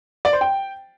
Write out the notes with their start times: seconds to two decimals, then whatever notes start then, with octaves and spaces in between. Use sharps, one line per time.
0.25 D5
0.33 C5
0.41 G5